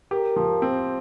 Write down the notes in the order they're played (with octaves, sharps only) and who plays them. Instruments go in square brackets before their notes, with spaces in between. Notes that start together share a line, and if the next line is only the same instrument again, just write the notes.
[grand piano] G4 [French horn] A#4
[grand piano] F3
C4